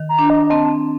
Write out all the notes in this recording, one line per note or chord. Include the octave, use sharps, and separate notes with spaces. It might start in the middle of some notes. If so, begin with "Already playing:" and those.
Already playing: D#3
A#5
D4
D#5
C4 A5